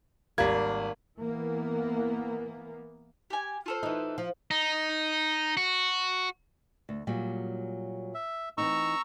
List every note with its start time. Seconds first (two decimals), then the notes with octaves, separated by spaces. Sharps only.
0.38 G#1 G3 A#3 G#6
1.19 E3 A#3 B3
3.30 G4 G#5
3.66 F4 A4 C5
3.83 E3 D#4
4.18 F3
4.51 D#4
5.57 F#4
6.89 D2
7.07 A#2 F#3 G3
8.14 E5
8.58 E3 C4 D#4 A#5 C#6 E6